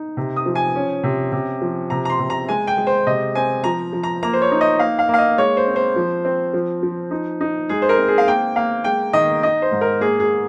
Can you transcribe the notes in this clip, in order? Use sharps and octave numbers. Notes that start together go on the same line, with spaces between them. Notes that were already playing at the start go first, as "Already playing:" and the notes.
Already playing: D#4
C3
D#6
F3
G#5
C#4
C3
C3
F3
C3 A#5
A#5
C6
C3
A#5
G#3 G#5
G5
G#3
C5
C3 D#5
C4 G#5
F3 A#5
F3
A#5
A#3 A#5
C5
C#5
D#4
D#5
A#3 F5
F5
A#3
F5
D#5
G#3 C#5
C5
C4
C5
F3
C4
F3
F3
D#4
D#4
G#3 G#4
C5
A#4
C4
G#4
F5
A#3 G5
A#3 F5
G#3 G5
D#3 D#5
D#4 D#5
C5
G#2
A#4
A#3 G#4
G#4